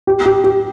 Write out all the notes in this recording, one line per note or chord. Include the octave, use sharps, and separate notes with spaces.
G4
G4
G4